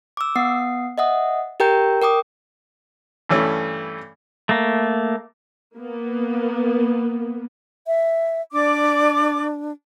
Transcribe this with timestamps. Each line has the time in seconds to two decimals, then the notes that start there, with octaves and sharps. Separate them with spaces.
0.17 D6 E6
0.36 B3 F#5 D#6 C7
0.98 D#5 E5 F#5 D#6
1.60 G4 A#4 G5 A#5 G6
2.02 A#4 G5 D6 D#6
3.29 G2 E3 A3 C#4
4.49 A3 A#3
5.76 A#3 B3
7.87 E5
8.52 D4 D5 D6